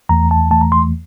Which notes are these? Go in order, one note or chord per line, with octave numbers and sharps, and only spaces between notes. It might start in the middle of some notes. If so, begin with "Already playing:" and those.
E2 E3 A3 A#5
A5
E2 E3 A3 A5
A#5
C6